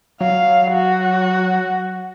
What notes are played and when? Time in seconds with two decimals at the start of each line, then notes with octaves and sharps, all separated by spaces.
0.20 F#3 F5
0.72 F#4